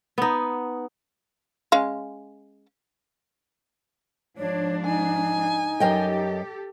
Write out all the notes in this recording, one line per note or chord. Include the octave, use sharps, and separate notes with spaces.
B3 D#4
G#3 C#4 F5
G#2 F3 D4 C#5
D#4 G#5
F#2 G4 A4 D#5 G5